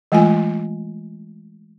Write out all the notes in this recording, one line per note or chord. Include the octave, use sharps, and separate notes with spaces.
E3 G#3 A3 F4 G#5